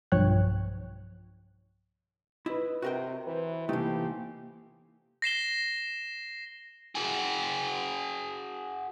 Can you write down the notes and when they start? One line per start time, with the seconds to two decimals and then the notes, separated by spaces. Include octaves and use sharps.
0.12 B1 G2 F3 C#5 G5 F#6
2.46 E4 B4 D#5
2.82 C3 F#4 A#4 G5
3.27 E3 B4 C5
3.69 C3 E3 A3 A#3 D#4 E4 G4
5.22 A#6 C7 E7 G7
6.95 F#4 G#4